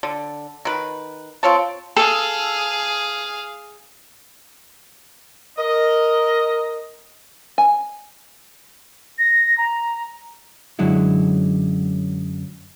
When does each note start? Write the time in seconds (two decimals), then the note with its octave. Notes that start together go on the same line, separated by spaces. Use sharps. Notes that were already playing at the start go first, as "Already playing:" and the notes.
0.03 D3
0.65 D#3 B4
1.43 C4 F4 C#5 A5
1.96 G#4 A4 F5
5.58 A#4 D#5
7.58 G#5
9.19 A#6
9.58 A#5
10.79 F#2 D3 F#3 G#3 E4